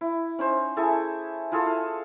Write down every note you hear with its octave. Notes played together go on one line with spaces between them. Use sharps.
E4
C#4 D#4 C5
E4 G#4 A4 G#5
E4 F4 G#4 A4
F5